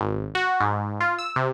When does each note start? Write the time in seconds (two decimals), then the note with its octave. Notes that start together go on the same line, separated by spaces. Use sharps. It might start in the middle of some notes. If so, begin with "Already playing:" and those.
0.01 G#1
0.35 F#4
0.60 G#2
1.01 F4
1.19 E6
1.36 C3